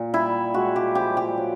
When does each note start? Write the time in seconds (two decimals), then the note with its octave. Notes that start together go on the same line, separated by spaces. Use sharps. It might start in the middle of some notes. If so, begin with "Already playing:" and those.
Already playing: A#2
0.14 G3 E4
0.54 G#3 F#4
0.76 G4
0.95 F3 G4
1.17 G4
1.37 F#3